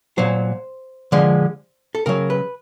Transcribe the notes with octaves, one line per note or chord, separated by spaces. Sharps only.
A#2 F#3 C5
D3 F3 G#3
A4
C#3 F#3 A#4
B4